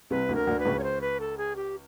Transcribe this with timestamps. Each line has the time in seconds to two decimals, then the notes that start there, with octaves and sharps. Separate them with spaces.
0.10 C2 C3 B4
0.29 D2 D3
0.35 A#4
0.47 D2 D3
0.60 B4
0.65 C#2 C#3
0.79 C#5
0.83 C5
1.01 B4
1.20 A4
1.38 G#4
1.56 G4